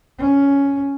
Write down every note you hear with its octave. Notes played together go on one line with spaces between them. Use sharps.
C#4